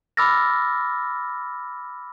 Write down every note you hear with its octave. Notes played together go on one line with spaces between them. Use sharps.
B5 D6 E6 F6 A6 A#6